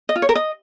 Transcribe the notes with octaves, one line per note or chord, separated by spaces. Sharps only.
D#5
F4
C#5
A#4
D#5